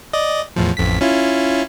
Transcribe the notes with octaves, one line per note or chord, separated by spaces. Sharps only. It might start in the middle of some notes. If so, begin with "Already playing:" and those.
D5 D#5
E2 A2 F3
A1 F2 B6
C#4 E4 F4